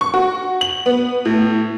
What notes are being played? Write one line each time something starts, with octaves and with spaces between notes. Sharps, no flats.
C#6
F#4
F#7
B3
A2